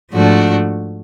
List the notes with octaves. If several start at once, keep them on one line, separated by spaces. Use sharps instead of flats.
G#2 F3 A3 D4 F#4